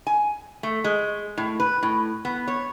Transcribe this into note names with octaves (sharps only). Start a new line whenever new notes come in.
G#5
A3
G#3
A2
B4
A2
B3
C#5